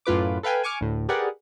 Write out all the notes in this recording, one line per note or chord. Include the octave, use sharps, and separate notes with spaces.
F#2 A2 F4 B4 D6
A4 B4 F5 G5 G#5
G#5 C#6 D6 F6
D2 A2
G4 G#4 A#4 B4 D5 F#5